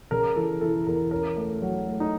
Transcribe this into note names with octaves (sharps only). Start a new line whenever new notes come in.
C#3 A#4
E3 A4
E3 A4
E2 A#4
C#4 A#4
A3
F#3
A3
D#4